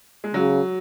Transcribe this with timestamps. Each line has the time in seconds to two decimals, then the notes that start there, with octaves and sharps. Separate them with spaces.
0.24 G#3
0.34 C#3 F#3